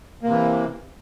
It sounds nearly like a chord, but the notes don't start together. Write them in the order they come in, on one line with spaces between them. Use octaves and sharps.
A#3 C3 E3